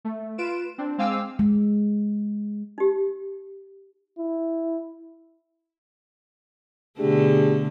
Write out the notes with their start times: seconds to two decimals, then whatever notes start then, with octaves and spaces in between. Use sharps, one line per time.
0.05 A3
0.38 F4 B4 D7 E7
0.78 C4 D4
0.98 G#3 C4 F5 G#5 D6 E6
1.39 G#3
2.78 D#4 G4
4.18 E4
6.99 B2 D3 A3 D4 G4 G#4